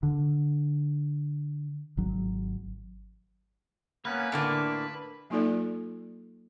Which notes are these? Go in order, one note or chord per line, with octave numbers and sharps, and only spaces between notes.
D3
G#1 F#3
A#3 B3 C#4 B4
A2 D3 A#3 D4
F#3 A#3 D#4 F4 A4 D5